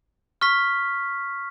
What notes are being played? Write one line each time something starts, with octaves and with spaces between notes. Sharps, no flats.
C#6 F6 B6